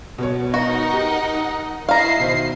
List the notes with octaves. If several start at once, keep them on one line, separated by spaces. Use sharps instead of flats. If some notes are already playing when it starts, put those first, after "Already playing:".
B2 B3 C#5
D#4 F#4 A#4 F#5
G4
D#6
E4 D#5 F5 A#5 C7
B2 D#3 C5